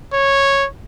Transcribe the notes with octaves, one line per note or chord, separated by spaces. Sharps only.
C#5